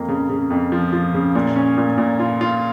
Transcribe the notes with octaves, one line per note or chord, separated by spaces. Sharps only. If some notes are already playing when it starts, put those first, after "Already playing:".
Already playing: F2 A#3
C#3
C#3
F2
F3
F3
C#3
A#2
C#4
A#2
A#2
F4
F4